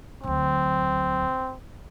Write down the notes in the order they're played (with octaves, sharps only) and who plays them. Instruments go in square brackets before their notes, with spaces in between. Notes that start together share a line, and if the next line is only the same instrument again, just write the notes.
[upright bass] D2 F#3 [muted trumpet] C4